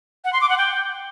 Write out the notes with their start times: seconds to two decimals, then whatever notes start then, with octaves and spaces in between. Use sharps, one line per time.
0.24 F#5
0.33 C6
0.41 D6
0.49 F#5
0.58 G5